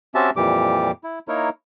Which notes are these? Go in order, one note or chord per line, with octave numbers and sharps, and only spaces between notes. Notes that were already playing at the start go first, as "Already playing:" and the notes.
C4 C#4 F#4 G4 E5 A5
F2 A#2 E3 G3 G4 D6
E4
A#3 D#4 E4 A#4 C#5